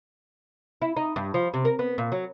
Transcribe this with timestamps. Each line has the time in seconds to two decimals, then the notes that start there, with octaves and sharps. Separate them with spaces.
0.82 E4
0.97 D#4
1.16 G2
1.34 F3
1.54 C3
1.65 A#4
1.79 B3
1.98 A#2
2.12 F#3